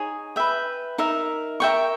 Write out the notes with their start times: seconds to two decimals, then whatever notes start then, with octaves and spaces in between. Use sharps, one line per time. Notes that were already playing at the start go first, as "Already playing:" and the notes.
Already playing: D#4 G#4 C#5
0.36 B4 E5 G5
0.98 D#4 A#4 E5
1.60 A#4 E5 G5 C#6